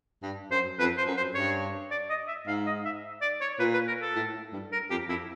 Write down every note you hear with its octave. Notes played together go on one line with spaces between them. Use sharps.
G2
F#2 C5
F2 B4
C5
F#2
C5
G2 C#5
D5
D#5
E5
G#2 F5
D#5
E5
D5
C#5
A#2 B4
B4
A#4
A4
A2
G2
A#4
F2 G4
F2 E4